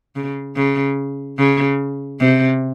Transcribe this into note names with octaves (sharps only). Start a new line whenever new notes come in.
C#3
C#3
C#3
C3